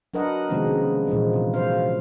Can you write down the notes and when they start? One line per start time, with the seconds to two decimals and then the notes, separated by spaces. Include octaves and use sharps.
0.14 F#3 D4 A#4 B4 D#5 F#5
0.49 C3 D#3 F3 G#3 B3 C4
0.67 C#3
1.07 A#2 E3 F3 G#3
1.33 C3
1.54 F#3 G#3 C5 F5